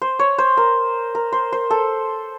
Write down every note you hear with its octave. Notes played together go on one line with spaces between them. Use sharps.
C5
C#5
C5
A#4
A#4
C5
C5
A4